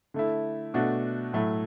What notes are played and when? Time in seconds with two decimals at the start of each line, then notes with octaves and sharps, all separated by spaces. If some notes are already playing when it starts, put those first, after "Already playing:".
0.14 D3 A3 E4
0.74 B2 A3 D4 F#4
1.33 A2 F#3 A3 E4